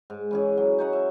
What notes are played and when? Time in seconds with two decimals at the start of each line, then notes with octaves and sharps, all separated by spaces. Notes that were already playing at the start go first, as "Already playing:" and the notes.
0.10 G#2
0.31 E3 C#4 G#4
0.58 F#3
0.78 D#4 C#5 F#5
0.93 E5